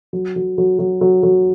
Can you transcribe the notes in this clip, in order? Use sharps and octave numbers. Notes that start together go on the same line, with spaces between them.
F#3
F#3
F#3
F#3
F#3
F#3